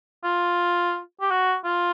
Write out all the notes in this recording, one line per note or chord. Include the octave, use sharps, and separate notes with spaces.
F4
G4
F#4
F4